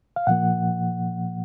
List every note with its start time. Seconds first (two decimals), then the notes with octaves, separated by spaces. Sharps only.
0.16 F5
0.27 A#2 F3 A#3 F#5